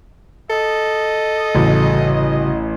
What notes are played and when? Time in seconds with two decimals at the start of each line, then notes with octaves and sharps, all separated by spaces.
0.50 A4 D#5
1.55 A1 C#3 G3 F#4